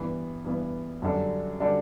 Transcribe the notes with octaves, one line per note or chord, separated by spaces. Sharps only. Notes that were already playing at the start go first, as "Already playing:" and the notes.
Already playing: G2 E3 B3
G2 E3 B3
F#2 D3 G3 D4 A4
D3 G3 D4 A4